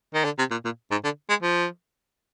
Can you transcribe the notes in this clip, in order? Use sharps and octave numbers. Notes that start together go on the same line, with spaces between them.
D#3
D3
C3
A#2
A#2
G#2
D3
G#3
F3